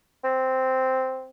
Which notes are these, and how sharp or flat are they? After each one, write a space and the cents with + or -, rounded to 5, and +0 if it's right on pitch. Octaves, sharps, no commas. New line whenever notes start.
C4 -5